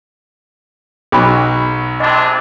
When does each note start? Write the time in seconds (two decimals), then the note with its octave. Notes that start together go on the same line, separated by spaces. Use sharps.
1.12 B1 F#3 G#4 B5
2.00 G#1 C3 D4 D#5